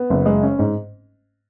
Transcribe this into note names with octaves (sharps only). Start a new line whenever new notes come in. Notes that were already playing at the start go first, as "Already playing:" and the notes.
Already playing: B3
F#1
G#3
C#4
G#2